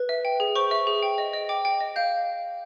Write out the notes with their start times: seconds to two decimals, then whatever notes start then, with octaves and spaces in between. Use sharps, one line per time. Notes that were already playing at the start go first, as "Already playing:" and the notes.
Already playing: B4
0.09 E5
0.25 G5
0.40 G#4
0.55 C5 C#6
0.71 E5
0.87 G#4
1.03 G5
1.18 D#5
1.33 D#5
1.49 G5 D6
1.65 G5
1.80 D#5
1.96 F5 G6